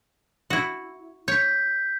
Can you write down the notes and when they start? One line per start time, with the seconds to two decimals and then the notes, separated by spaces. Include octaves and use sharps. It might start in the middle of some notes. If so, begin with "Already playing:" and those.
0.50 E4 F#4
1.28 C#5 G6 B6